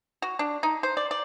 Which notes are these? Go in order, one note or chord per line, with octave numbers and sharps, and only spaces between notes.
F#4
D4
D#4
C5
D5
D5